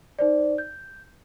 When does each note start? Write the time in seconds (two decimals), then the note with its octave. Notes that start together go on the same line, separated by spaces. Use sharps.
0.19 D#4 C5 D5
0.58 G6